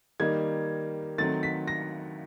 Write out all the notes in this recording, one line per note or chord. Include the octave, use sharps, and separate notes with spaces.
D#3 G3 A#3 D#4 G#6
D#3 F#3 A3 C4 A6
B6
A#6